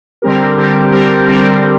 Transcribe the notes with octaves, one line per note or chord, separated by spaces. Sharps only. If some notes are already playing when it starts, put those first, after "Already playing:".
D3 G3 C4 G4 A#4
D3 G3 C4 G4 A#4
D3 G3 C4 G4 A#4
D3 G3 C4 G4 A#4